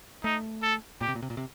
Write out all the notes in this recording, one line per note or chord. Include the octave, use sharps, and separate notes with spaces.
A3 D#4
A4
A#2 G4
C3
A#2
C3
A#2
C3